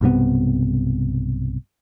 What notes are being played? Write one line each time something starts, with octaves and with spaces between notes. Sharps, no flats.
B1 G2 C3 B3